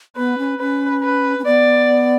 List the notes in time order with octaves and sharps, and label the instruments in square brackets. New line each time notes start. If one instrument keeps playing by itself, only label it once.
[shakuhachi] B3 [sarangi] B4
[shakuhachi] C#4
[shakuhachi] C#4 [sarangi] B4
[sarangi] B4
[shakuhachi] C#4
[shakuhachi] B3 [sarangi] D5